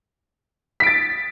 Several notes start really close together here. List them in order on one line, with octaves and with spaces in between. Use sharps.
B6 D7 A6